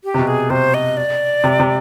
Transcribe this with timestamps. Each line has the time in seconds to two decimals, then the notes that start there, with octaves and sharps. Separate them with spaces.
0.04 G4
0.14 C3
0.19 B2
0.27 G#4
0.50 C3 C5
0.74 D#5
0.97 D5
1.44 C3
1.60 C3